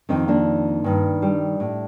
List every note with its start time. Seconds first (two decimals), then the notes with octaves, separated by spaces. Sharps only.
0.09 F2 D#3 C4 D#4
0.28 A#3 D4
0.84 G2 D#3
1.22 G3
1.60 A2